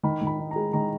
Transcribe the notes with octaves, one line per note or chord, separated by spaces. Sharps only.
D#3 B5
D#3
B5
D#4
G#3 A#5
D#3 A#5